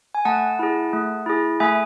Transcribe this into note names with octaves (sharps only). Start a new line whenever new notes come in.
G#5
A3 F#5 A5
E4 G#4
A3
E4 G#4
A3 E5 G#5